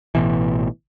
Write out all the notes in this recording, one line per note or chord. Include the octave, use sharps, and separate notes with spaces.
A1 B2 E3